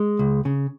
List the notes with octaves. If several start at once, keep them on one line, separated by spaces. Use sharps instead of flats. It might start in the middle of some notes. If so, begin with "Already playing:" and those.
Already playing: G#3
C#2
C#3